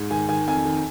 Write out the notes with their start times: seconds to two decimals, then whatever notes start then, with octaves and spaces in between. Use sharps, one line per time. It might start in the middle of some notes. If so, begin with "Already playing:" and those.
Already playing: G#2
0.11 D#3 G#5
0.29 D#3 G#5
0.48 F2 G#5
0.65 D#3